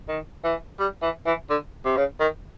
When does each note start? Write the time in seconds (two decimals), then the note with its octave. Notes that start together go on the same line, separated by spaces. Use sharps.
0.08 D#3
0.44 E3
0.79 G3
1.02 E3
1.26 E3
1.50 D3
1.85 C3
1.97 C#3
2.20 D#3